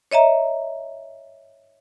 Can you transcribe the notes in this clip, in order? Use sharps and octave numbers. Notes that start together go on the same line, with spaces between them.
C#5 D#5 E5 A#5